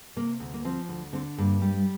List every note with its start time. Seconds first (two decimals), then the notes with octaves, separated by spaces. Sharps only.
0.16 C3 A#3
0.40 D2
0.54 A#3
0.64 F3 C4
0.89 D2
1.13 D3 C4
1.38 G2 A#3
1.62 G3